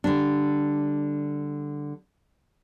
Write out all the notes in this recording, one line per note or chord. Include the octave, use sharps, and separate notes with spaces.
D3 G3 D4